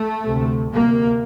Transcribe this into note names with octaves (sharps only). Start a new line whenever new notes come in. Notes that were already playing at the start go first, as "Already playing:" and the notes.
Already playing: A3
D2 C3
D2 C3 A#3